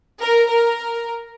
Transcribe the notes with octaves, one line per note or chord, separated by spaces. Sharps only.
A#4
A#4